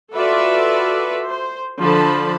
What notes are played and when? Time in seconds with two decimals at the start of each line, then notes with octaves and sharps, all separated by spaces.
0.15 F4 F#4 A4 B4 D5 E5
1.25 C5
1.80 D3 F3 D4 A5 B5